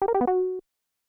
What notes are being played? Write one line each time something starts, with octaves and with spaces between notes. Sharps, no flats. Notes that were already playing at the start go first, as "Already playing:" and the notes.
G4
A#4
G4
B3
F#4